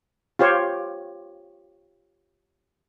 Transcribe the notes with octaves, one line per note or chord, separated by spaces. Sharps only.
F4 G4 C5 C#5